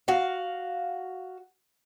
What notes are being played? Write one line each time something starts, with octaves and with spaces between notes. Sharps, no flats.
F#4 F5